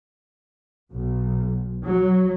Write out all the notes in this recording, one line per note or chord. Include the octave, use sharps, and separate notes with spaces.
B1
F#3